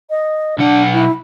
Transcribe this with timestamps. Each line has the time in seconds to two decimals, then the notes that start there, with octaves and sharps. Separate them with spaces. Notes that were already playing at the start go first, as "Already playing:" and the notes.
0.10 D#5
0.58 B1 D4 F#5
0.93 E4